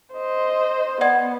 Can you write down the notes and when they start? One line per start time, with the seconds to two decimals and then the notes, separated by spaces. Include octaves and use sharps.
0.13 C5 D#5
1.01 B3 D5 F#5 G#6